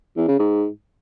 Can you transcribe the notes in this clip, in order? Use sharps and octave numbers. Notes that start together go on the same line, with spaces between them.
E2
C#3
G#2